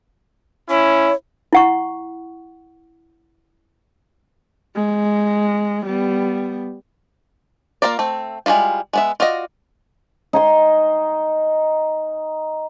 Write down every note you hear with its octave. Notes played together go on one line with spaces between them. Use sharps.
C#4 E4 C#5
E4 F#5 C#6
G#3
G3 B3
A#3 B3 F4 A#4 D5
A3 C4
G3 G#3 A#3 E4 F4
G#3 B3 E5
F4 F#4 D5 D#5
D#4 G#5 C6